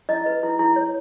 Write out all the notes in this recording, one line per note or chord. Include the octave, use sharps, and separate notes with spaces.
E4 D#5
B4
E4
E4
C#5